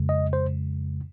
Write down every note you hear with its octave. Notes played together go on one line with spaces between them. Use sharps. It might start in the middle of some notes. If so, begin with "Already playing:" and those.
Already playing: F2 C#3 G#3
D#5
C5